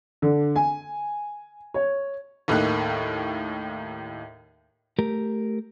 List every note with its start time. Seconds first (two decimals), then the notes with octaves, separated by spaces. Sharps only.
0.22 D3
0.56 G#5
1.74 C#5
2.48 D#2 A2 A#3 D#4 F#6
4.99 A3 G4 A#4 A#5